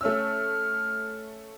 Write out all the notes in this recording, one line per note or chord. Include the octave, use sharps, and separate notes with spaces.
A3 C#4 E6 F6